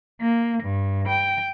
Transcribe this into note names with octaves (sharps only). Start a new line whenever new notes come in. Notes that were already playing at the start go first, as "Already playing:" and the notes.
A#3
G2
G5